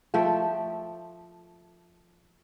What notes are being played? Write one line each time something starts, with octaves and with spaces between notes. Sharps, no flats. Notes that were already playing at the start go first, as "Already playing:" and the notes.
F3 A3 E5 G5